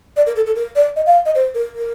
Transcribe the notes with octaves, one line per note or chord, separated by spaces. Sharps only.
D5
A#4
A4
A4
A#4
D5
D#5
F5
D#5
C5
A#4
A#4